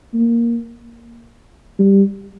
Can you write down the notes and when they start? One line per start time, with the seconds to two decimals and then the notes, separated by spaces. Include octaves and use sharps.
0.14 A#3
1.80 G3